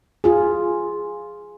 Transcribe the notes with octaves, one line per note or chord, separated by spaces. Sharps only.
F4 G#4